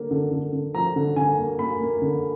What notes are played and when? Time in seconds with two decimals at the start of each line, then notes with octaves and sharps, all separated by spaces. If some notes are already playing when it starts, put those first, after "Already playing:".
Already playing: D3 A#3
0.11 D3
0.31 D3
0.53 D3
0.75 F3 A#5
0.96 D3
1.16 D3 G#5
1.38 A#3
1.59 A#3 B5
1.81 A#3
2.02 D3